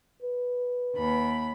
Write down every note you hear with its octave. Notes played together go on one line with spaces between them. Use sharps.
B4
D#2 B5